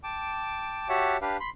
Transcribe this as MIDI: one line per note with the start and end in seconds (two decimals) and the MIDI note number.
0.04 0.88 79
0.04 0.88 81
0.04 0.88 86
0.89 1.17 66
0.89 1.17 67
0.89 1.17 73
0.89 1.17 76
0.89 1.17 78
0.89 1.17 81
1.21 1.37 62
1.21 1.37 67
1.21 1.37 71
1.21 1.37 77
1.40 1.50 83
1.40 1.50 84